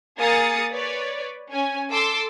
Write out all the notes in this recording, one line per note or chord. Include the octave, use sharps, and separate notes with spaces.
A#3 G#4 D#6 A6 C#7
B4 C#5 D5
C#4 G#5
A4 C6 D6 E6